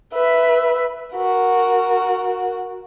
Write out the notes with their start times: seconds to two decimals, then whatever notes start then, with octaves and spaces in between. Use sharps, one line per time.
0.14 B4 E5
1.15 F#4 A#4